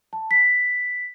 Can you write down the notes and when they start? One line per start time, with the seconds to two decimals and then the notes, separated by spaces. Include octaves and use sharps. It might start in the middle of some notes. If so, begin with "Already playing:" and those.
0.13 A5
0.31 B6